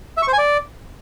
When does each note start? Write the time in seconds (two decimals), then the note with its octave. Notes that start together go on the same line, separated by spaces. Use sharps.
0.17 E5
0.22 C#6
0.28 C5
0.33 G#5
0.38 D5